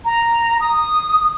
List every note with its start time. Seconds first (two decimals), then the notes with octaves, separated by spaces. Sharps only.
0.05 A#5
0.61 D#6